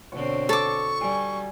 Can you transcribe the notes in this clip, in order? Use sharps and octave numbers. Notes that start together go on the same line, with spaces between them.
B2 D3 C4 F#4 C#5
A4 C#6 D6
G3 G#5